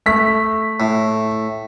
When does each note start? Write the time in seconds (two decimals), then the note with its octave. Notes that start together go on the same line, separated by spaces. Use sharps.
0.06 A3 B6
0.80 A2